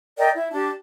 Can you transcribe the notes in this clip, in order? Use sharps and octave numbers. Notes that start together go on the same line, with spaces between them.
A#4 D5 D#5 G5
E4
D4 G4 A5